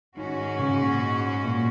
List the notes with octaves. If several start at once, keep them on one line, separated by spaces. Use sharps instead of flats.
G#2 D#3 G#3 C#4 F#4
D#3
C#3
A#2
A#2